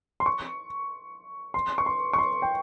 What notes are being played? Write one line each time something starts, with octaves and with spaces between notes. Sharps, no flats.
C6
C#6
C6
C#6
C6
C#6
C6
G5